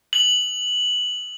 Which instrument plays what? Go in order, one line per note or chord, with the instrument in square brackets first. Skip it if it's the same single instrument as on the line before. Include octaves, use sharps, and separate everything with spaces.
[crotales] F#7